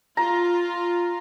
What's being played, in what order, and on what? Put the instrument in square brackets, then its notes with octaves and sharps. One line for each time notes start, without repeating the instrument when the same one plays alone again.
[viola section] F4 [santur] A#5